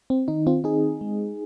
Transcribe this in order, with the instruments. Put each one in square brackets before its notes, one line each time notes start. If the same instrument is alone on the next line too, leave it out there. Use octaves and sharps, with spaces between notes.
[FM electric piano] C4
D#3 D#4
C4 F4
C4 D#4 G#4
G#3